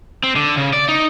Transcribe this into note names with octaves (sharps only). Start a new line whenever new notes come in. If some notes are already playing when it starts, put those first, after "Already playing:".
C4
D3
C#3
D5
D#4